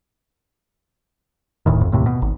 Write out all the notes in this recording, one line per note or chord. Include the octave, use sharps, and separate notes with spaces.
D1 D2 A2 D#3
G#1 F2
D#2 A2 C3
B2
G#1